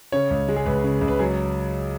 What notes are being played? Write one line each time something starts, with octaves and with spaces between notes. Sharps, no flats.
C#3 C#5
C#2
G#3
G#4
C#2 B4
C#3
C#2
B4
F#3 G#4